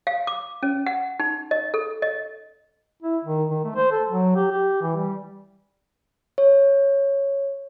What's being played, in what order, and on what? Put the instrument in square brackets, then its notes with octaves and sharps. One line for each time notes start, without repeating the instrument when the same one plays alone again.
[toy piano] F5
D6
C#4
F#5
D#4
D#5
A4
D#5
[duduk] E4
D#3
D#3
A3
C5
A4
F#3
G4
G4
E3
G3
[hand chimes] C#5